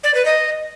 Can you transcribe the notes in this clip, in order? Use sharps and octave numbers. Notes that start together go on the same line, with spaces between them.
D5
B4
D#5